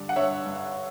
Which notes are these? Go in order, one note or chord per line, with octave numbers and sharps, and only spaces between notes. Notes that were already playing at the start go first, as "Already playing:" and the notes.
Already playing: G2 D3 G3 D5
F#5
G2 C#5 E5
G2